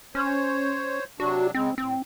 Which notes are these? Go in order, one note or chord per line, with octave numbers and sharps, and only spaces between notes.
C#4 C5 C#5
C3 F#3 D4 F#4
C#3 G#3 C4
A2 C4